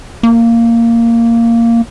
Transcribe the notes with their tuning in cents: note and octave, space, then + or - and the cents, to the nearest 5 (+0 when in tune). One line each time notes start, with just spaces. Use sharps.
A#3 -10